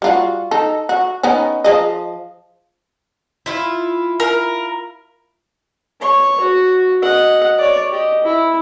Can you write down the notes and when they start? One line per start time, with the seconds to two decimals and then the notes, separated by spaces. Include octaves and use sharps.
0.02 G3 F4 F#4
0.51 D#4 A4
0.89 F#4
1.23 B3 C#4 D#4
1.64 F3 G#4 D#5
3.46 E4 F4
4.20 A#4
6.01 C#5 C#6
6.40 F#4
7.02 D#5 F#5
7.58 C#5 D5
7.92 G4 D#5
8.24 E4